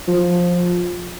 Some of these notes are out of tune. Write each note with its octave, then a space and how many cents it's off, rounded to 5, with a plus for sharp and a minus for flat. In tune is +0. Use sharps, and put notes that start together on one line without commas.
F3 +15